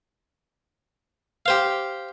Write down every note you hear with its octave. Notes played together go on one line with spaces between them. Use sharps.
G4 C5 F5